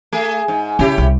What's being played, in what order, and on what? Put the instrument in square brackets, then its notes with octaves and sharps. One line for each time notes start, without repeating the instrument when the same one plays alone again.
[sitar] A3 G#4
G#2
[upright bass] C#3 [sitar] C#4 E4 G4
[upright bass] C2